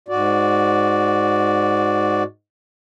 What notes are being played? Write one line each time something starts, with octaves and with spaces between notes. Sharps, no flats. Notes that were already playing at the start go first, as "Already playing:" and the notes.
G#2 F#4 D5